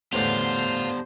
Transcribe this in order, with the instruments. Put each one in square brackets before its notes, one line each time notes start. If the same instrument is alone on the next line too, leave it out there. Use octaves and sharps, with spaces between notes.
[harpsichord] E2 A2 D3 [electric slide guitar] B3 G4 D5 [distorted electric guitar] F4 [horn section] C5